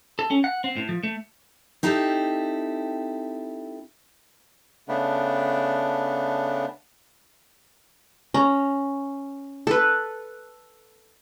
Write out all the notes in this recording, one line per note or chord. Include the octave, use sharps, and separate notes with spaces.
A4
C#4
F#5
C4
A2
F3
A3
C4 D#4 E4 G4 A4
C#3 A3 B3 D4
C#4 A#5
A4 B4